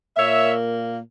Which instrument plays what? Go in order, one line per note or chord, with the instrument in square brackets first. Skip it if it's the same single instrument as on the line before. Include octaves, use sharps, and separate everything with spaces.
[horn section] A#2 A#3 C#5 E5